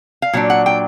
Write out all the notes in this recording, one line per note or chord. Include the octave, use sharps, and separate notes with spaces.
F5
A#2 F#3 D4
F#5
G5